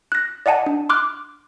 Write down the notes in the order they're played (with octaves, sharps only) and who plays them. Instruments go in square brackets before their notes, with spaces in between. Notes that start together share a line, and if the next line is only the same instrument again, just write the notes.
[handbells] F#6 A#6
D5 D#5 F#5 G#5 A5
D4
C6 D6 F6 F#6